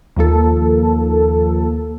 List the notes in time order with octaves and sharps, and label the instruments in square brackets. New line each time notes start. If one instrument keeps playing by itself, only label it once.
[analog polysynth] D#2 F3 A#3 A4